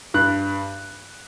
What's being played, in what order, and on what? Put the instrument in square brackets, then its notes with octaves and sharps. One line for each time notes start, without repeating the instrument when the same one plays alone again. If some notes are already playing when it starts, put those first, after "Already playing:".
[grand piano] G2 F#6